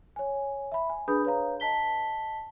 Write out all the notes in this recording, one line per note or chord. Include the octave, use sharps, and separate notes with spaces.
C#5 G#5
E5 B5
G#5
D4 G#4 B4 B5 D#6 G6
B4 C#5 F5 A#5
D#5 A5 B6 G7